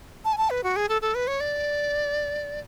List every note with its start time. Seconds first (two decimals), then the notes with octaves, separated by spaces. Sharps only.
0.25 A5
0.33 G#5
0.38 A5
0.50 B4
0.64 F#4
0.76 G#4
0.89 A4
1.02 A4
1.15 B4
1.27 C#5
1.40 D5